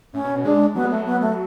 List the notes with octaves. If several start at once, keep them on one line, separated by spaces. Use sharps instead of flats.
A2 C#4
B2
B2
G#3 D4
F#3 B3
G#3
F#3 A3
B3
A3